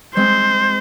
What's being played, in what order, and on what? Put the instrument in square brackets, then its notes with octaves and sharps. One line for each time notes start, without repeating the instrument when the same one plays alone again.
[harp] G#3 C4 [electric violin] C5